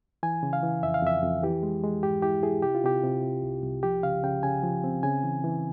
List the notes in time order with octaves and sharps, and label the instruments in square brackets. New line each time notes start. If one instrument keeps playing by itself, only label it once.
[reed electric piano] E3 G#5
C#3
F5
E3
F2 E5
F5
F2 E5
F2
E3 G4
G#3
G#3
G#2 G4
E4 G4
E4 G#4
C3 G4
F4
C3 G4
C3
C3
C2
C2
F3 G4
C#3 F5
C#3 G5
C#3 G#5
F3
C4
C#3 G#5
E3
E3